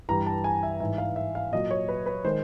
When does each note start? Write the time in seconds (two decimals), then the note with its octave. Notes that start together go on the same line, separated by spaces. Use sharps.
0.09 G2 E3 G3 A#5
0.26 A5
0.44 G#5
0.63 E5
0.80 G#2 E3 G#3 E5
0.98 F5
1.16 E5
1.35 F5
1.52 A#2 F#3 D#5
1.71 C#5
1.88 B4
2.06 B4
2.25 D#3 G#3 C5